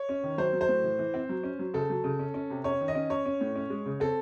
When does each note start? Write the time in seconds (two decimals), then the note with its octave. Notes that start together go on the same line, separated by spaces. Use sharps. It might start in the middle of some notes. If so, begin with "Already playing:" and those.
Already playing: C#5
0.09 C#4
0.23 D#3
0.38 F#3 C5
0.53 F#3
0.61 C5
0.69 A2
0.84 E3
0.99 E3
1.14 C4
1.29 F#3
1.44 C#4
1.59 F#3
1.74 C#3 A4
1.90 F#3
2.04 C#3
2.19 C#4
2.34 C#4
2.50 C3
2.64 C#4 C#5
2.81 D#3
2.88 D#5
2.95 C#4
3.10 C#4 C#5
3.26 C#4
3.41 A2
3.56 C#4
3.70 G#3
3.86 C#3
4.00 C4 A4